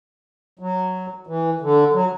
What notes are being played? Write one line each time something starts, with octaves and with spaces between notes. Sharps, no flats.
F#3
E3
D3
F#3